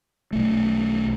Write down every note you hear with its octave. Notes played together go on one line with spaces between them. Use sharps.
B1 A3